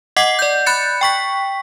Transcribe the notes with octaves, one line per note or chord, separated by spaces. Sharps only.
D#5 F#5 D6 C7
D5 G6
B5 F#6 G6 A6 C#7
G5 C#6 B6